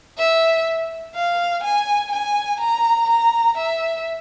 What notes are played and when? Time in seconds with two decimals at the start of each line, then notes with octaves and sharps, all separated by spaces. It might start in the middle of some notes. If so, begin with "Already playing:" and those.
0.18 E5
1.15 F5
1.63 G#5
2.12 G#5
2.61 A#5
3.10 A#5
3.58 E5